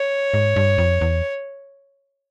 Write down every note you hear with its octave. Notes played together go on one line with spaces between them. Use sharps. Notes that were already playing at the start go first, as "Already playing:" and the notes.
Already playing: C#5
G#2
G2
F2
E2